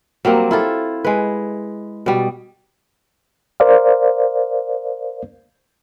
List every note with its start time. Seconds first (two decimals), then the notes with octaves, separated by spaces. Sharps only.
0.25 F#3 G3 A#3 C4
0.51 E4 F4 A4
1.05 G#3 B4
2.06 B2 G3
3.60 A#4 C5 D5 F5